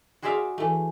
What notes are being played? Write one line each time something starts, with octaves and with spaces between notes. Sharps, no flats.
F#4 G#4 C5 D5 E5 F5
E3 A3